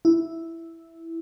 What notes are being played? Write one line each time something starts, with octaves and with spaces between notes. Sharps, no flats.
E4